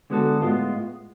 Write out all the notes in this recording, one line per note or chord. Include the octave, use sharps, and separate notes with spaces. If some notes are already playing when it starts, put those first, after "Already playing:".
D3 G#3 B3 F#4 A4
A2 G#3 B3 F4